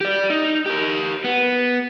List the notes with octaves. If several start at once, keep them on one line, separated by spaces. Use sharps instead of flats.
G4 D5
D#4
G4 A#4
B3